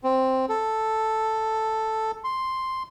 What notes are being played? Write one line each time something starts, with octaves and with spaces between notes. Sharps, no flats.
C4
A4
C6